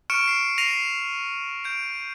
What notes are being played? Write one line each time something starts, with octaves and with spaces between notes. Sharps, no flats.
C#6 F6 C#7 D7 E7
C7 D7
A#6 C7 D#7 F7
G6 D7